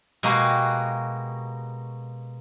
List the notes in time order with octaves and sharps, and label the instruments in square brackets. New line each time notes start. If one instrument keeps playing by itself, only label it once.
[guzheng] B2 G#3 A#3 F#4 G4